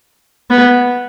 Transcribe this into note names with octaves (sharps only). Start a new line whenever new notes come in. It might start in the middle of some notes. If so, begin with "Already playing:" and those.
B3